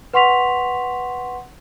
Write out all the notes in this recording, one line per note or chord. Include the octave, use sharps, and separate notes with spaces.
B4 F#5 C6 C#6 B6 F7